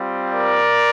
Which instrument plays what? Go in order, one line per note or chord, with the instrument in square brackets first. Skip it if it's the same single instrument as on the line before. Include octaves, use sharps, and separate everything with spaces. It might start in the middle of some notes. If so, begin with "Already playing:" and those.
Already playing: [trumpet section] G3 C4 F4
A#4 D5